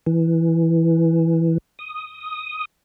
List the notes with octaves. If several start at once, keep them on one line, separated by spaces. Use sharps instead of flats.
E3
D#6